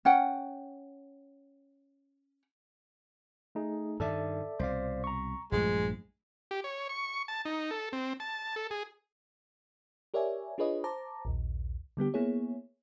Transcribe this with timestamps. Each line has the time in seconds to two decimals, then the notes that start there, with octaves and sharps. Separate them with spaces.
0.05 C#4 F#5 G5
3.55 A3 D#4 G#4
4.00 G2 D#3 A4 D5 E5
4.59 C2 B2 C5 D5 F5
5.04 A#5 C#6
5.52 A#1 G2 F3 G#3 A3
6.51 G4
6.64 C#5
6.89 C#6
7.28 A5
7.45 D#4
7.71 A4
7.93 C4
8.20 A5
8.56 A4
8.71 G#4
10.14 G4 A#4 C#5 D5 E5 G#5
10.58 D4 F4 G#4 B4 C#5 D#5
10.84 C5 A5 A#5 D6
11.25 A#1 D#2
11.97 D3 G3 B3 G4
12.14 A#3 B3 E4 G#4 C#5